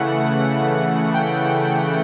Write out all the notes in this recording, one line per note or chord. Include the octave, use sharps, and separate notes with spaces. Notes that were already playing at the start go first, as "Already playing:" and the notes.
Already playing: C#3 E3 A3 F#5
F#5
G5